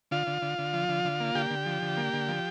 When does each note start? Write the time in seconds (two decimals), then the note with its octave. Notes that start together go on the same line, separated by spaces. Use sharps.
0.11 D3 F4 F5
0.27 D3
0.42 D3
0.58 D3
0.73 F3
0.89 D3
1.05 D3
1.20 A#3
1.35 D3 G4 G5
1.50 D3
1.66 F3
1.82 D3
1.97 A#3
2.13 D3
2.28 F3